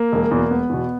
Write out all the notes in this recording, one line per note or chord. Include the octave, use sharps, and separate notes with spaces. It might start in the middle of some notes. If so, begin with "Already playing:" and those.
Already playing: A#3
E1
E2 B2
E1 B3
E2 B2